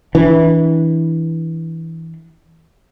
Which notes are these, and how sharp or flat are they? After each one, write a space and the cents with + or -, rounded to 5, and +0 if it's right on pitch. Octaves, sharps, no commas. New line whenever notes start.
E3 -20 D4 -25